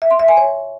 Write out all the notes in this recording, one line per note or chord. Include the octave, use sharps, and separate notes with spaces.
E5
C6
E5
G#5
C#5